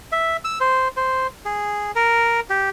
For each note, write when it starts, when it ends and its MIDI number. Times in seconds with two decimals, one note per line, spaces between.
0.12 0.37 76
0.45 0.59 88
0.60 0.88 72
0.97 1.27 72
1.45 1.91 68
1.95 2.40 70
2.50 2.70 67